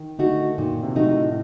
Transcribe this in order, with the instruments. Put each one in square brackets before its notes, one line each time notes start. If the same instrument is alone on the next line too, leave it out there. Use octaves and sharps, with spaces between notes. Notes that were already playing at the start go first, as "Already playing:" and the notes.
Already playing: [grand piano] D#3
[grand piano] D3 [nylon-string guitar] A3 D#4 F#4
[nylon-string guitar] A#2 [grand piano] D#3
[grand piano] C3
[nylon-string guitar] A3 D#4 F#4
[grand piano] A2